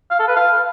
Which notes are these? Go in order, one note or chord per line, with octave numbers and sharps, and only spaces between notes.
F5
A4
B4
F5